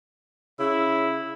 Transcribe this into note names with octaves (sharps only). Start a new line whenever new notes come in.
C#3 E4